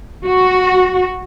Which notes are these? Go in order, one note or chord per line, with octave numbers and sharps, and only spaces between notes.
F#4